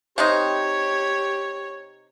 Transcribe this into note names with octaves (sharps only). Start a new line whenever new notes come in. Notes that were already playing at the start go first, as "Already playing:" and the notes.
C3 C4 D#4 G4 C#5